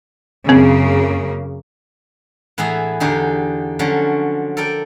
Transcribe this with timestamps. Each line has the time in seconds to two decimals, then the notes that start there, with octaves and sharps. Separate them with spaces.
0.49 F#2 C#3 A#3 C4
2.58 A2 E3 B3 G#4 E5 A#5
3.00 E2 D3 D#4 G4 G#4
3.79 D3 F3 F#3 C#4
4.57 A4 A#4 D5 G5